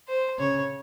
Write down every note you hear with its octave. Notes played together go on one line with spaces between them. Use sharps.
C5
C#3 C#5